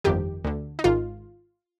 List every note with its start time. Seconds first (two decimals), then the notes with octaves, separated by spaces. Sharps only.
0.04 G1 F2 D#3 G4
0.44 D2 D3
0.79 D#4
0.84 G#1 G#2 D#3 F4